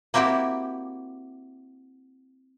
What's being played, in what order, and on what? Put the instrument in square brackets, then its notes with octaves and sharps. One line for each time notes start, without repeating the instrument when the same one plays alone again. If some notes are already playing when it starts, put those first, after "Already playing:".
[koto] A#3 C4 E4 F#4 G4